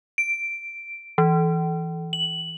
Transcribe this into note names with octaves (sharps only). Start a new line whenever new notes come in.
D7
E3
F#7